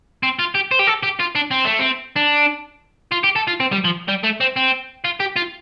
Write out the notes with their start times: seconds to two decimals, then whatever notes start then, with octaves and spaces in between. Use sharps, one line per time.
0.23 C4
0.39 F4
0.55 G4
0.71 C5
0.79 G4
0.87 A4
1.03 G4
1.20 F4
1.35 D4
1.51 C4
1.65 A3
1.79 C4
2.16 D4
3.12 F4
3.24 G4
3.36 A4
3.48 F4
3.60 C4
3.72 G3
3.84 F3
4.08 G3
4.23 A3
4.40 C4
4.56 C4
5.05 F4
5.20 G4
5.36 F4